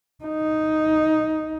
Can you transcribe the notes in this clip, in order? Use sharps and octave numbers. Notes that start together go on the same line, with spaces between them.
D#4